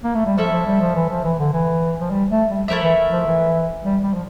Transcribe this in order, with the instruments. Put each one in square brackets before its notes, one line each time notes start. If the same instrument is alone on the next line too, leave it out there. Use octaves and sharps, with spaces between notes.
[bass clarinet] A#3
A3
G3
[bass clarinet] F3 [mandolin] C#4 E4 A4 E5
[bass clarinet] F3
G3
F3
E3
F3
E3
D3
E3
F3
G3
A3
G3
[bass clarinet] F3 [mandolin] A3 E4 A#4 E5
[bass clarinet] E3
F3
E3
G3
G3
F3